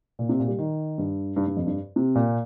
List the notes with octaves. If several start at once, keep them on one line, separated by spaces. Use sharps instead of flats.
A#2
C3
A#2
G3
D#3
G2
G2
G2
F2
G2
C3
A#2